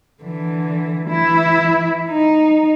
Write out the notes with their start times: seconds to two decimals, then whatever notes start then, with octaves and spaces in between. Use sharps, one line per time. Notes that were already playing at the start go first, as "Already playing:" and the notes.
0.23 D3 E3
1.09 E3 E4
2.09 D#4